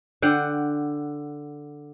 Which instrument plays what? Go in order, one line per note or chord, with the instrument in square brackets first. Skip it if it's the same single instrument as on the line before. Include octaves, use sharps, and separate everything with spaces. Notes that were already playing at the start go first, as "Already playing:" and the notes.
[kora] D3 F#5 G5